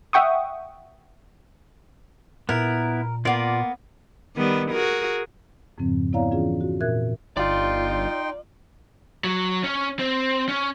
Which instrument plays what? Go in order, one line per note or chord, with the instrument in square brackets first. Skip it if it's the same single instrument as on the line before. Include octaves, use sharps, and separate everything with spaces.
[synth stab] E5 F#5 G5 C#6 D#6
[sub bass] A#2 [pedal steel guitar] B3 E4 [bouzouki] A#4
[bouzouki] A#3 B3 [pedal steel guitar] F4 D5
[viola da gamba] D#3 G3 B3
F#4 G#4 A#4
[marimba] F2 G#2 C#3 F3 C4
B3 E4 C#5 D5 F5 A#5
E3 C#4 F4 G#4
F#4
A#2 A#4 E5 F#6 G#6
[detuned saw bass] G1 [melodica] D#4 G5 C6 [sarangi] F4 [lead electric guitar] D5
[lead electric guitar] F#3
C#4
C4
C#4